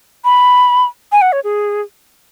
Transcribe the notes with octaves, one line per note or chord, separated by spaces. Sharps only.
B5
G#5
F#5
C#5
G#4